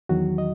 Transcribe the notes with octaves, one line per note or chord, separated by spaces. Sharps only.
E2 D#3 F#3 F#4
D#5